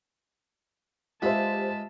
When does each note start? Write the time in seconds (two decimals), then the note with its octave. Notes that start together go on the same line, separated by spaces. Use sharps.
1.22 G#3 F4 G4 B4 C5 E5 A5 B5